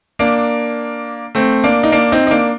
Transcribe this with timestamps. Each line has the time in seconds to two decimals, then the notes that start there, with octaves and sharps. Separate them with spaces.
0.19 A#3 D4
1.35 A3 C4
1.64 A#3 D4
1.83 D#4
1.92 A#3 D4
2.12 C4 D#4
2.27 D#4
2.31 A#3 D4